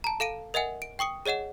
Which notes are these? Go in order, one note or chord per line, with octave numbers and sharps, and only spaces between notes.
A5 A#5
A4 F5 D7 D#7
A#4 D#5 E5 F#5 G#5
D7
G5 C#6 D#6 C#7
G#4 C#5 D#5 F#5 E7